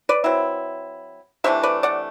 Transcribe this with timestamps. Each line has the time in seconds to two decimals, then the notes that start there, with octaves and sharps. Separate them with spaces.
0.09 B4 D5
0.24 F#3 C4 E4
1.44 C3 E3 A3 D4 C5 E5
1.63 B4 D5
1.83 D5 F#5